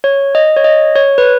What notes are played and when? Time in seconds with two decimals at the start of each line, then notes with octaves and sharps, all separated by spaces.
0.04 C#5
0.35 D#5
0.57 C#5
0.64 D#5
0.95 C#5
1.18 B4